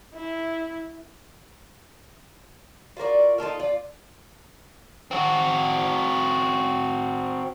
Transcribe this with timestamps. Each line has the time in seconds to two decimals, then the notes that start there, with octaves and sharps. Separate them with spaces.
0.15 E4
2.97 F4 F#4 A#4 D5
3.38 D#4 F4 A4 A#4
3.60 F4 D5
5.11 C4 F#4